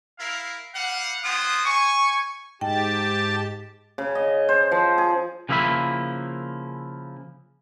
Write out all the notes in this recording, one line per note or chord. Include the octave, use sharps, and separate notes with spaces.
E4 A#4 F5
G3 F5 F#5
C4 C#4 F4 F#5 D#6
G#5 C#6
G#2 G4 G5 A5
C#3
D#5
C5
F3
G#4
C#3 F3 A#3 E4 E5 B5